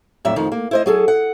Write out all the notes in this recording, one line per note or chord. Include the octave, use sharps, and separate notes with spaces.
F2 A2 F#3 D4 E5
F2 D#3 F3
A#3
E4 C5 D#5
F#3 G#4 A4
F#5